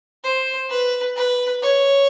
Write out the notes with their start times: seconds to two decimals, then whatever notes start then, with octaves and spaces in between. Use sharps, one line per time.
0.24 C5
0.70 B4
1.16 B4
1.63 C#5